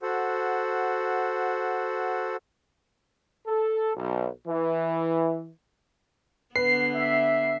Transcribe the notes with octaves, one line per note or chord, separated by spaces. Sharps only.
F#4 A4 C5 F#5
A4
B1
E3
D3 B3 B4 C7
E5